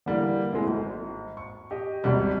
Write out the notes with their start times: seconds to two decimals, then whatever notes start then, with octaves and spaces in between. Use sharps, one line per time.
0.06 D3 E3 G3 A#3
0.52 G#3 A3 C4 E4
0.67 G#1
1.37 C#6
1.71 G4 D#5
2.04 G#1 D#2 C3 G3